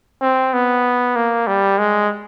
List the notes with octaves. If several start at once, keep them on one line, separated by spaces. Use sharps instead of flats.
C4
B3
A#3
G3
G#3